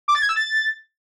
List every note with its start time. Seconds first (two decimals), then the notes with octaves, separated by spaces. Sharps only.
0.08 D6
0.15 A6
0.22 G#6
0.29 E6
0.36 A6